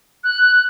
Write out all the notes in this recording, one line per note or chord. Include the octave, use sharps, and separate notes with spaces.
F#6